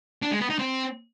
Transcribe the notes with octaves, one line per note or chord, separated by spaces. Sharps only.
D4
G#3
B3
D#4
C4